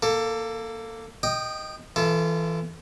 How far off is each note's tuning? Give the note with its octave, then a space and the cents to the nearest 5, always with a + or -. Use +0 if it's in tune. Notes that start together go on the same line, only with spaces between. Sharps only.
A#3 +0 A4 +20
D#5 +0 G5 +0 D#6 -30
E3 +0 F4 -30 A4 +0